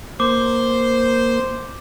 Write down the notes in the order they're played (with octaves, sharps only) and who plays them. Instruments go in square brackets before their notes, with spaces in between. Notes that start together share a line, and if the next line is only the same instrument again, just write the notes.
[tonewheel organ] A#3 [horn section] C5 [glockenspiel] D6